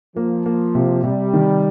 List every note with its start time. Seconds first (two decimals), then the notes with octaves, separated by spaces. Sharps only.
0.16 F3 A#3
0.46 A#3
0.75 C3
1.04 C3 G3
1.34 D#3